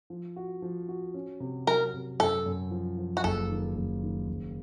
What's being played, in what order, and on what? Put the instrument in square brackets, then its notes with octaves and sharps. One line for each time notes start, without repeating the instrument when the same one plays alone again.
[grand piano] F3
F#4
F3
F#4
C#4
C3
[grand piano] F#3 [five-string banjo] A#4
[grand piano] C3
[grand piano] F#2 [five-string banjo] A4
[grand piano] F#2
F3
F3
[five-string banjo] F#4
[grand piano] F#1 [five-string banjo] A4
[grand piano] D#3
F#1
D#3
F#1